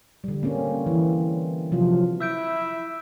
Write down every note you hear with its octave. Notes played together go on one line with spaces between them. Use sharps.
D3 G3
A#3 C4 C#4
E3
C3 F3 F#3 F4
E4 E5 E6 G6 D7